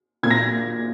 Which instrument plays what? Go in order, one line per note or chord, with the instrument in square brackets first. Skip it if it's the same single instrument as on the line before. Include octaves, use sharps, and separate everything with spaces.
[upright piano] A#2 G#6
A#6